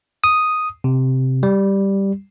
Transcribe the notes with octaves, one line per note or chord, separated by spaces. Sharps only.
D#6
C3
G3